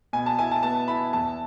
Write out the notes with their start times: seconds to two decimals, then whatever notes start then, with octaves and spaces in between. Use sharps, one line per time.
0.13 B2 G#5
0.26 A5
0.39 E4 G#5
0.51 A5
0.63 B3 A5
0.88 E4 B5
1.13 E2 A5